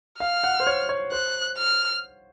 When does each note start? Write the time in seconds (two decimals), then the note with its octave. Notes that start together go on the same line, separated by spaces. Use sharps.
0.20 F5 F6
0.44 F#5
0.60 C5
0.67 C#5
0.89 C#5
1.12 C5 F#6
1.57 F6